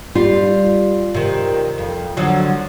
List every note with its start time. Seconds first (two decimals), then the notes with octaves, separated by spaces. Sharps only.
0.15 G3 F4
1.15 C3 D#3
1.78 F2
2.17 D3 F3 F#3